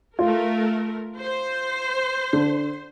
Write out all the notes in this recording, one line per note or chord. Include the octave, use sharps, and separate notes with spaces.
A3 F4 A#4
C5
D3